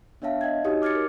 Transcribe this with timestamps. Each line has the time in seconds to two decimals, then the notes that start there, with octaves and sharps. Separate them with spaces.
0.22 B3 D4 C#5 E5 F5 A5
0.41 D#5 G5 G#6
0.64 D#4 F#4 G4 C#5 D#6
0.82 D6 F6 G#6 A6 C#7
0.95 A#4 D6